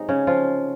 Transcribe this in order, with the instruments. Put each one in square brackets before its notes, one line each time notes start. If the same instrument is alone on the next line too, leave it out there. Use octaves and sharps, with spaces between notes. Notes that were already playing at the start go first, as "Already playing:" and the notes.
Already playing: [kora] C3 F#3 G#3 D#4
C#3 C#4
F3 F4